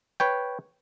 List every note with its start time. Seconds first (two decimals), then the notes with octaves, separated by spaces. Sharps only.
0.20 B4 C#5 G5